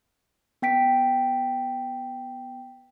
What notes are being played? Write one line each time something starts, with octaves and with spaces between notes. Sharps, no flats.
B3 G5 B6 D7